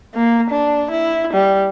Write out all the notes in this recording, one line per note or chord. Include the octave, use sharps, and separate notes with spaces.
A#3
D4
E4
G3